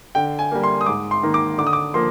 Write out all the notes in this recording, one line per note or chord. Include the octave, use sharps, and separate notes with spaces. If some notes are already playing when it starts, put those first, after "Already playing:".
D3 G5
G#5
G3 A#3
C6
D#6
G#2 D6
C6
D#3 A#3
D6
D3 D6
D#6
D6
F3 A#3 C6